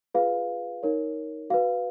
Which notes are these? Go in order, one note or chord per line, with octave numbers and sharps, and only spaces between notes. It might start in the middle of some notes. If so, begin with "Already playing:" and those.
F4 G#4 B4 F5
D#4 A#4 C#5
F#4 B4 F5